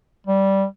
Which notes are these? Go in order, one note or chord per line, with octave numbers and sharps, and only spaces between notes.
G3